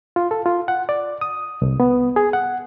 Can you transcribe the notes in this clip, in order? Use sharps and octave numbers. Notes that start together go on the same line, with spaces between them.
F4
A4
F4
F#5
D5
D#6
C2
B3
G#4
F#5